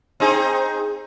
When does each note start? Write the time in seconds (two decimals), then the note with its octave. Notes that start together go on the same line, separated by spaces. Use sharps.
0.20 C4 D#4 G#4